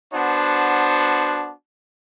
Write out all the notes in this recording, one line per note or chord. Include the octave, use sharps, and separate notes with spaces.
B3 D4 F#4 C5 A5